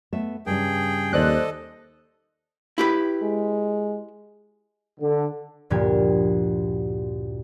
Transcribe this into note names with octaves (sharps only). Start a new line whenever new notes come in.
A3 B3 E5
G2 C#3 G3 G#4 G5
D#2 A4 C5 D5 D#5 F#6
E4 G4 B4
G#3
D3
D2 G2 A#2 F3 G4 G#6